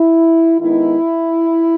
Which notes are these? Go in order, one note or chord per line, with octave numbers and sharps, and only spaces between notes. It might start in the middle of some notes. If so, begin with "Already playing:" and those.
Already playing: E4
D#3 G#3 B3 D#4 E4